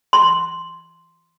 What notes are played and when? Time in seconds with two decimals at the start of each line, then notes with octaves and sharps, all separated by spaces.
0.13 C6